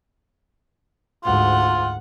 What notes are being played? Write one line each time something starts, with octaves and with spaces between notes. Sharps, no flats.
D2 G#2 F4 F#5